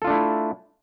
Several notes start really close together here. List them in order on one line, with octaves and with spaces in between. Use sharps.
A4 F4 D4 A3 E4